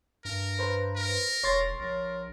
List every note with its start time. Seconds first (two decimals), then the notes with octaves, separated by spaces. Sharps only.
0.25 G2 A#4
0.59 B4 C5 A#5
0.96 A#4
1.43 E1 C#5 C6 A6
1.80 A#1 A#4